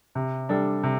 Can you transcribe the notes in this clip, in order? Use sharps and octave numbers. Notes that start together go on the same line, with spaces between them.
C3
G3 D4 A4
C3